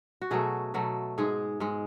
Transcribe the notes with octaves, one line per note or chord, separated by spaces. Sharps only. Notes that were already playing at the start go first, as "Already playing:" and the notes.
F#4
B2 F#3 A3 G#4
B2 F#3 A3
G#2 G#3 G#4
G#2 G#3